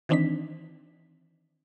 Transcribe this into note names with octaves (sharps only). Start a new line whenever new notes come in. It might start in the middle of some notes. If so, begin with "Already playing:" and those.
D#3 E3 C4 D4 D#4 B6